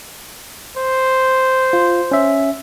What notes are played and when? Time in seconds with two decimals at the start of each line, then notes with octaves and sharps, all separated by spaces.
0.77 C5
1.73 F4
2.11 C#4 E5